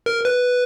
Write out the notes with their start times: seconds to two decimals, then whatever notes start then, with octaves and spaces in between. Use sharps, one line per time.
0.06 A#4
0.25 B4